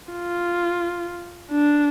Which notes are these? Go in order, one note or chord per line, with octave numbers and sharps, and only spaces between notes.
F4
D4